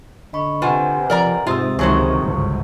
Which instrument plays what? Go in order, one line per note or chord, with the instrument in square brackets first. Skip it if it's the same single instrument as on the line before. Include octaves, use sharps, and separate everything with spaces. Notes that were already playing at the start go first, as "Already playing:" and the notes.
[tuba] D3 [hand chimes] D#5 B5 C#6
[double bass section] C3 [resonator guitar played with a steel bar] F4 [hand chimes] B4 F#5 G#5
[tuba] F3 [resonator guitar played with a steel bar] A#4 D5 A#5
[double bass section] G#2 [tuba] C3 [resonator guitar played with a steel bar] F4 [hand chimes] E5 D#6 E6
[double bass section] C#2 D#3 G#3 [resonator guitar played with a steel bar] E3 F#3 C5 [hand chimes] C#6
[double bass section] G1 C#2 G#2